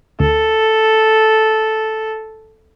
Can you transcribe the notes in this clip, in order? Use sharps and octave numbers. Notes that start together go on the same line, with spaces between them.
D2 A4